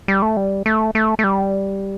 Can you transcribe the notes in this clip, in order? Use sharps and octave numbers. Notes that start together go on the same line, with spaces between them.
G3
A3
G3
A3
A3
A3
G3